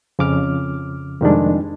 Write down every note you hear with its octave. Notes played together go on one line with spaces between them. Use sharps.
F2 C#3 D6 F6
F2 C3 D#3 G3 G#3 D4